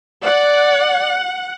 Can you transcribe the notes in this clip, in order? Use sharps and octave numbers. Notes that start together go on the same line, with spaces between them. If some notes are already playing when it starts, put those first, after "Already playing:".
D5 F#5